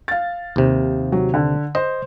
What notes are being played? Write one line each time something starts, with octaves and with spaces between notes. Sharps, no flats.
F5 A6
D#2 C3
F#3
D3
C5 D#5